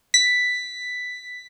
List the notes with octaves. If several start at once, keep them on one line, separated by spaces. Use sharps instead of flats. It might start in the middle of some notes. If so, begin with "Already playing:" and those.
B6